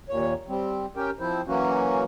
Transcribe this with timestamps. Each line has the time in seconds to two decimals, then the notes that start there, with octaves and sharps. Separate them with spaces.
0.09 D#2 A#2 C#5
0.48 G3 C4
0.96 C#4 G4 A#4 G5
1.20 F3 C4 E4 C5
1.47 E3 F#3 A#3 C#4 F#4